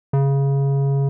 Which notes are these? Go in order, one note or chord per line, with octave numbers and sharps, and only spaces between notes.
C#3